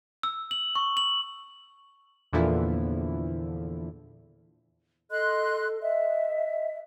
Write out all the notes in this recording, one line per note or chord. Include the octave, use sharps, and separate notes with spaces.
E6
F#7
C#6
F#7
E2 A#2 D3 E3 F3 E4
A4 D#5 C6 F#6
D#5 E5